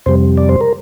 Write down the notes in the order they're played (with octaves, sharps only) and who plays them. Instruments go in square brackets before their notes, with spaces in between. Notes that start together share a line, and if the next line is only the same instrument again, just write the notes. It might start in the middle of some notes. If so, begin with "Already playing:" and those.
[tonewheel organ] F2 C3 G3 C5
D5
C5
A#4